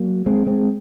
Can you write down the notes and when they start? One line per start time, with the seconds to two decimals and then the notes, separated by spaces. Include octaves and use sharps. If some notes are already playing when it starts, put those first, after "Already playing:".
Already playing: F#3 A#3
0.26 G#3 C4
0.47 G#3 C4